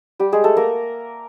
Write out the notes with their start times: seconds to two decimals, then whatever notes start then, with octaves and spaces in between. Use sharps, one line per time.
0.19 G3 G4
0.32 G#3 G#4
0.44 A3 A4
0.57 A#3 A#4